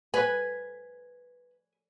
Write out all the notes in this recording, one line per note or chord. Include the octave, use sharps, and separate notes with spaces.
B4 G#5